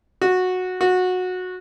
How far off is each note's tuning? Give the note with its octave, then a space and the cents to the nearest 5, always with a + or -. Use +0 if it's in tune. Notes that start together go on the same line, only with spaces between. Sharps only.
F#4 -10
F#4 -15